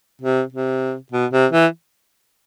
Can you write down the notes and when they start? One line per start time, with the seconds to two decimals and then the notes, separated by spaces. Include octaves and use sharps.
0.21 C3
0.53 C3
1.12 B2
1.32 C3
1.52 E3